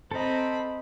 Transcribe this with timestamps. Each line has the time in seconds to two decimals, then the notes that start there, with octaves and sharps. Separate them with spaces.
0.11 C4 A4 D#5 A#5 B5 G6 C#7